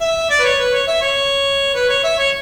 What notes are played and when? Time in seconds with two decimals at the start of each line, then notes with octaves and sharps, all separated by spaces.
0.01 E5
0.30 D5
0.39 B4
0.44 C#5
0.58 B4
0.73 C#5
0.87 E5
1.01 C#5
1.74 B4
1.89 C#5
2.04 E5
2.18 C#5